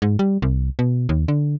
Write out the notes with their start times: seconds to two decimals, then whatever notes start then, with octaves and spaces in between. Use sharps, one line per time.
0.02 G#2
0.19 G3
0.42 C2
0.79 B2
1.09 D#2
1.28 D3